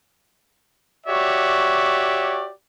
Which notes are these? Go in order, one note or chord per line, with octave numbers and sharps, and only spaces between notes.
F#4 G4 C#5 D5 E5